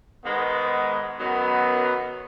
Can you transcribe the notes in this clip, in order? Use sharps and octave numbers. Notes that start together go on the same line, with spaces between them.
G#2 D#3 G#3 B3
F#2 D#3 F#3 B3